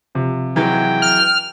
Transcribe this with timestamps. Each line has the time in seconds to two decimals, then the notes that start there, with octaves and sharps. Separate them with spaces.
0.15 C3 F3
0.56 E3 F#3 G#3 G5
1.02 F6